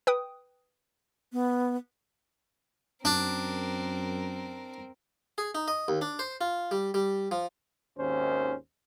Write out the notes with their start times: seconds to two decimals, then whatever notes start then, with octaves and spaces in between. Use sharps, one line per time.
0.07 B4 G5 D#6
1.33 B3
3.05 F#2 C4 D4 A#4
5.38 G#4
5.55 D#4
5.68 D#5
5.88 D#2
6.01 D4
6.19 C5
6.41 F4
6.71 G3
6.94 G3
7.31 F3
7.97 G#1 D#2 C#4 C5